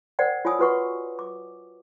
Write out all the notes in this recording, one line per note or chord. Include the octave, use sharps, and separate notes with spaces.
A#4 C5 D5 F#5 G5
F4 C#5 F#5 G#5 D#6 E6
F4 F#4 B4 F#5 C#6
D6